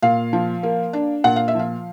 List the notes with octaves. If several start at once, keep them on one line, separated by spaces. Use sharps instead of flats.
A#2 F5
F3
A#3
D4
A#2 F#5
F5
E5
F3 F5